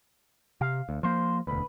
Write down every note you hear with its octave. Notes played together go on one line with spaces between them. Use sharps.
C3 F5
D2
F3 A#3 C5
E1 D2 B4